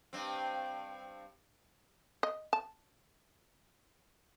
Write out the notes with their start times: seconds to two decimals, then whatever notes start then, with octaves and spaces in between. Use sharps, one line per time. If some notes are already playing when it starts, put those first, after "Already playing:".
0.13 G2 C4
2.23 D#5
2.53 A5